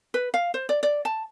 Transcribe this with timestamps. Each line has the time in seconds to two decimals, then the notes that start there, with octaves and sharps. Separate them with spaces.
0.14 B4
0.34 F5
0.54 C5
0.69 D5
0.83 D5
1.05 A5